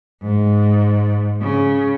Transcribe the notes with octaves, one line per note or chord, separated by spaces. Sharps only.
G#2
C#3